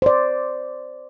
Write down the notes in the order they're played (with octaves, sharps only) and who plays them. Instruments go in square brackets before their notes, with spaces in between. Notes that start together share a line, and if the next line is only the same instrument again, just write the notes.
[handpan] C5 D5